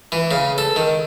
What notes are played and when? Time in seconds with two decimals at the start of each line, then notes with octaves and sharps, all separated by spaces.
0.12 E3
0.31 C#3
0.58 A4
0.76 D#3